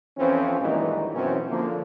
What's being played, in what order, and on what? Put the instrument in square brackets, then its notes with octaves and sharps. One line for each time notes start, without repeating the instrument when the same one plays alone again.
[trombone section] F2 E3 F3 C4 C#4
G2 A#2 D#3 E3 F#3 G#3
F#2 B2 E3 C4 C#4
D3 F3 A#3